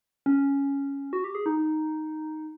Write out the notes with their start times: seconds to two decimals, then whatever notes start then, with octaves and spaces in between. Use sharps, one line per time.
0.26 C#4
1.13 F#4
1.24 G4
1.35 G#4
1.46 D#4